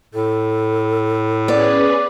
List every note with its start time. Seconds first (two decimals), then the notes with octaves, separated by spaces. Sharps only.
0.14 A2 A4
1.48 B3 C#4 G#4 B4 D5